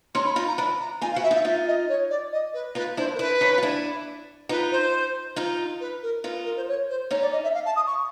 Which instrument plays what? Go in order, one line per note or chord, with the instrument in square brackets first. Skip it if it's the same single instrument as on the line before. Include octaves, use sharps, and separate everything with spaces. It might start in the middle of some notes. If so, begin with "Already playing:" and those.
[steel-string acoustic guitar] C#4 D#4 [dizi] C6
[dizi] B5
[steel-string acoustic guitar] D#4 F4 [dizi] B5
[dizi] A#5
[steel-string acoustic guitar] D4 E4 [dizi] B5
[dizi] A#5
[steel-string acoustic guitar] D#4 F4 [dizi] G#5
[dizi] F5
[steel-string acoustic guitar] E4 F#4
[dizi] E5
[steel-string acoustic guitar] D#4 F4
[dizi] E5
[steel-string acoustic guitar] D#4 F4 [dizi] E5
[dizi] D#5
C#5
D5
D#5
B4
[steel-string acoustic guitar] D#4 F4 [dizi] B4
[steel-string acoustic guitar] D4 E4 [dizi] C5
[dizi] A#4
[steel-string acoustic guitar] D4 E4 [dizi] B4
[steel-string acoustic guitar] C#4 D#4
F4
D4 E4
[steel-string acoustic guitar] D#4 F4 [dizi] B4
[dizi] C5
[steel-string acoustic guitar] D#4 F4
[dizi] B4
A#4
[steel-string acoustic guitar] D#4 F4 [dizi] B4
[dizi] A#4
C5
C#5
C5
[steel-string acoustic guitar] C#4 D#4 [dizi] C#5
[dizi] D5
D#5
E5
F5
A5
D#6
C#6